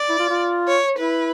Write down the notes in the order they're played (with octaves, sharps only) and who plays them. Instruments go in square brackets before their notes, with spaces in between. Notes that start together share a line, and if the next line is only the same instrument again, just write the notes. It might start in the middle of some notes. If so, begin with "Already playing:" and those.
Already playing: [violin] D5
[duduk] E4
F4
F4
[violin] C#5
[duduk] E4 [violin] B4